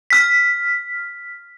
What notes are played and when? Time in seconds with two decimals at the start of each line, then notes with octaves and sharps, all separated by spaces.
0.10 F6 B6